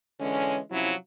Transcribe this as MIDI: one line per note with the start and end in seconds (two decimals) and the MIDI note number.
0.20 0.59 50
0.20 0.59 52
0.20 0.59 56
0.20 0.59 61
0.72 0.93 48
0.72 0.93 53
0.72 0.93 54
0.72 0.93 61
0.72 0.93 64